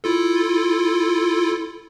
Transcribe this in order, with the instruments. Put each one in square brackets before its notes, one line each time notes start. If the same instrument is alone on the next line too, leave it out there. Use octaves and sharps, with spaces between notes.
[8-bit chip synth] E4 F4 A4